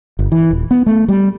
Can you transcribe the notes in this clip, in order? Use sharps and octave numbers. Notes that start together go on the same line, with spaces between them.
G1
E3
D#1
B3
A3
G3